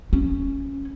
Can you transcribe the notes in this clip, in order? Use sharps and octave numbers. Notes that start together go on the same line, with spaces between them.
C#4